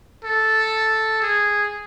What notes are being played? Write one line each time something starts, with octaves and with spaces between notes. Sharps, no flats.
A4
G#4